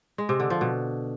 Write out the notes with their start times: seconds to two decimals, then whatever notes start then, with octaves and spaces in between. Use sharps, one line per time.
0.18 G#3
0.29 C3
0.40 D3
0.50 F3
0.61 B2